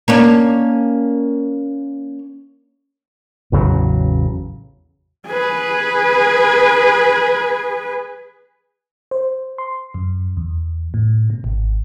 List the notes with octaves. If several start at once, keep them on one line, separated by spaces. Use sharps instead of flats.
A#3 C#4 D4
A1 E2 C#3 F#3
G#4 B4
C5
C6
F#2
E2
A2
B2
G#1